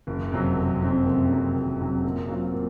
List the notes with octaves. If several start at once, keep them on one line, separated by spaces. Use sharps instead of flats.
F#1
F2 C3 F#3 C4
F#1
F2 C3 F#3 C4
F#1
F2 C3 F#3 C4
F#1
F2 C3 F#3 C4
A#2
F#3 C4 F4
A#2